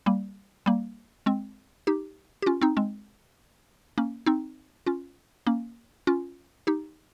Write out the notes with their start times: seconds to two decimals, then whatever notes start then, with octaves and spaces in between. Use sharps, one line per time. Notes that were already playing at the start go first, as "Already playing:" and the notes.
0.06 G3 A#3
0.66 G3 A#3
1.26 G#3 C4
1.87 D#4 G4
2.42 G4
2.46 C#4 F4
2.62 C4 D#4
2.77 G#3 C4
3.98 A#3 C#4
4.26 C4 D#4
4.86 C#4 F4
5.47 A#3 C#4
6.07 C#4 F4
6.67 D#4 G4